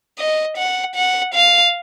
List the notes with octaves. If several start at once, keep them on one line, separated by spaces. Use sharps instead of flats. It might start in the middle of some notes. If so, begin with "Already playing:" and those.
D#5
F#5
F#5
F5